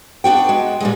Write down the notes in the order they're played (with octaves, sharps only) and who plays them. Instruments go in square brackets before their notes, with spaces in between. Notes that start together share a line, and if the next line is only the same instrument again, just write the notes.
[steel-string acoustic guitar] B3 D4 F#4 G5
G#3
A#2 G3 G#3